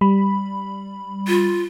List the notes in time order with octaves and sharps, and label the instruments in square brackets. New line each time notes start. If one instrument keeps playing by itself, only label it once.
[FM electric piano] G3 B5
[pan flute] F4